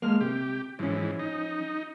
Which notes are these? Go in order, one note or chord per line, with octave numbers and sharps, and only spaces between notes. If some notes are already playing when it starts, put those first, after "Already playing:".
G#3 A#3 F6
C3 G4
G#2 E3 F3 C#4
D#4